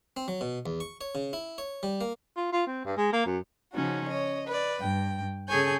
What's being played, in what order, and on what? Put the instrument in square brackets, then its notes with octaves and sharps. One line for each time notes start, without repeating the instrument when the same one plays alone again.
[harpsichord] C4
F#3
B2
E2
C#6
C#5
C#3
E4
C#5
G3
A#3
[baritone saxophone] F4
F4
C4
G2
G#3
A#3
F#2
[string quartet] C#3 F3 C#4 D#4 F#4
C#5 D#5
B4 D5
G2 G5
C#3 G#4 A4 C#5 G#5 G6